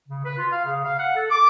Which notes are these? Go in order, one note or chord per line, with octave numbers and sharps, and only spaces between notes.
C#3
B4
F4
F5
C#3
F5
F#5
A4
D6